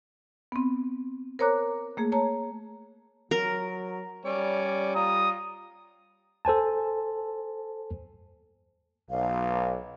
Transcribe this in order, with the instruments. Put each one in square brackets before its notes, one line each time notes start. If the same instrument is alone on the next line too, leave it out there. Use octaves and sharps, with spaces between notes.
[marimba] B3 C4
A#4 C5 C#5 A#5 D6 F#6
A3 A#3 G#4
C#5 A5 A#5
[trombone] F#3 [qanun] A#4
[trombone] G3 [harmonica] C#4 C#5 D5
[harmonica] F4 A#5 [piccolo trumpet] D#6
[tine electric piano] A4 C5 G#5 A5
[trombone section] B1 [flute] F5